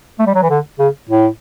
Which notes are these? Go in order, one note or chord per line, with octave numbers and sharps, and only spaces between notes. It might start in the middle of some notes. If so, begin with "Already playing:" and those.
A3
G3
F#3
E3
D3
C#3
A2